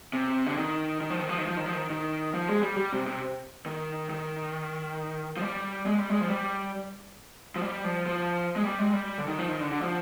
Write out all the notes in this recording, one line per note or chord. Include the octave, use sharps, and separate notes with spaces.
C3
D3
D#3
D#3
F3
D#3
F3
D#3
F3
D#3
F3
D#3
D#3
F3
G#3
G3
G3
C3
C3
D#3
D#3
F3
G3
G#3
G3
G#3
F3
G3
F3
G3
F3
F3
G#3
G3
G#3
G3
D3
D#3
F3
D#3
D3
D3
F3